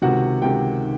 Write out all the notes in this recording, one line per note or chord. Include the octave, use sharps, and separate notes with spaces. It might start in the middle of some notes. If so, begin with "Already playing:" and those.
C#2 C3 D#3 F#4 F#5
C#2 C3 D#3 G4 G5